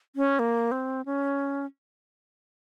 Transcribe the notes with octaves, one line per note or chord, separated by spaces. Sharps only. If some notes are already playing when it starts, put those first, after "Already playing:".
C#4
A#3
C4
C#4